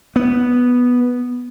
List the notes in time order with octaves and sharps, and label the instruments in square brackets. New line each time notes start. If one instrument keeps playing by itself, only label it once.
[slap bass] B3